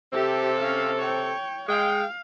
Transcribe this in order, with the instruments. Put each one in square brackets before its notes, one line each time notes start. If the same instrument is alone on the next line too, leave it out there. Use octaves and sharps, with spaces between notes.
[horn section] C3 C4 A4 [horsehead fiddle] G4 E5
[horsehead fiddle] C#4 F5
C#5 G5
[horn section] G#3 G5 [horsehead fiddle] F5